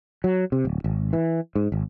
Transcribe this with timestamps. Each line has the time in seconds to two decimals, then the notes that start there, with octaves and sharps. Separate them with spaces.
0.24 F#3
0.52 C3
0.65 D1
0.84 G#1
1.13 E3
1.55 G#2
1.72 G#1